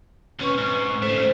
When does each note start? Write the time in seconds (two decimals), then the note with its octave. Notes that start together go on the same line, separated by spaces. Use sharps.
0.39 D#2 C4 C#4 B4 C#6
0.58 G#2
1.02 C#3 A3 C5